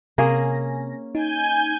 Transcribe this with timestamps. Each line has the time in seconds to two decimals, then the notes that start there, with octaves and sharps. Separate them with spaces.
0.18 C3 A#3 C#4 G#4 G#5 A#6
1.15 D#4 G#5 G6